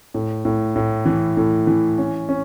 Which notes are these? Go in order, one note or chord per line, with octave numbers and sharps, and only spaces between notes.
A2
A2
A2
E3
A2
E3
C#4
C#4